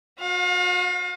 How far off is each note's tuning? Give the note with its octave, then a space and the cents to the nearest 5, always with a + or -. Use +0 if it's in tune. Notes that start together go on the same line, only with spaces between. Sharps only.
F#4 -40 F5 +35